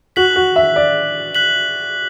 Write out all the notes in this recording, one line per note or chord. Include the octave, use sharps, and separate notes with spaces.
F#4 F#6 B6 F#7
F#4
E5
D5
F#6 B6 F#7